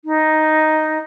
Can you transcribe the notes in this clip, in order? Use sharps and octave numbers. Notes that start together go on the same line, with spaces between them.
D#4